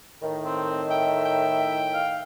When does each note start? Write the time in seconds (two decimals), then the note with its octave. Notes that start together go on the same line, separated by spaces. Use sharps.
0.22 A2 D#3
0.45 C4
0.90 E5 G5
1.25 G5
1.94 F5